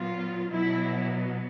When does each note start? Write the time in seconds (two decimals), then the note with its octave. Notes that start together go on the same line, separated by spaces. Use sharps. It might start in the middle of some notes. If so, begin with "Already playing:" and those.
Already playing: A#2 F#3 B3 F4
0.49 B2 F#3 B3 E4